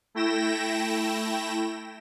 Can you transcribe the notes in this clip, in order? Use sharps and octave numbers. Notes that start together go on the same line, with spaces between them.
A3 E4 G5 A#6 E7